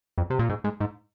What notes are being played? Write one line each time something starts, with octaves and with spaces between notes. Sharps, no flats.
F2
C3
A#2
G#2
G#2
G#2